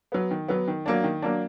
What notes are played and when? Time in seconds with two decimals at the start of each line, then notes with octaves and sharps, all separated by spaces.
0.12 F#3 B3
0.31 D#3
0.48 F#3 B3
0.68 D#3
0.86 F#3 A#3 D4
1.04 D#3
1.22 F#3 A#3 D4